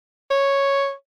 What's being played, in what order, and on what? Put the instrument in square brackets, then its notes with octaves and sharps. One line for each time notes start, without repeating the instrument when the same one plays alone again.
[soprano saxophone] C#5